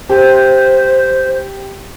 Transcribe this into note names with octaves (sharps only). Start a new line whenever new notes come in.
G4 C5